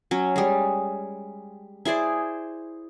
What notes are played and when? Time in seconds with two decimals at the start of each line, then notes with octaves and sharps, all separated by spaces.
0.11 F#3 C#4
0.36 G3 G#3
1.85 E4 G#4 C5 D5